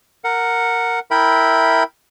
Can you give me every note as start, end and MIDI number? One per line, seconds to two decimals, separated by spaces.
0.24 0.99 70
0.24 0.99 78
1.11 1.83 64
1.11 1.83 70
1.11 1.83 76
1.11 1.83 79
1.11 1.83 83